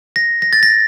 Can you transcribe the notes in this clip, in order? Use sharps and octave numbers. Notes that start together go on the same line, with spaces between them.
A#6
A#6
A6
A#6